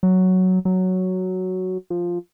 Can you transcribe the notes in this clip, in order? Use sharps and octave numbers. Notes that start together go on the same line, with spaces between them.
F#3
F#3
F3